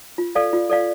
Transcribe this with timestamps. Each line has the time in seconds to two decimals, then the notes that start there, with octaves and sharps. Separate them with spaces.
0.18 F4
0.35 A4 D5 F5
0.53 F4
0.70 A4 D5 F5